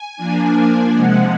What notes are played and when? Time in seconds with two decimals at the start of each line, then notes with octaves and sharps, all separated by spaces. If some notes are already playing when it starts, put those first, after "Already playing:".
Already playing: G#5
0.17 F3 A#3 D4
0.93 C3 F3 G#3 F#5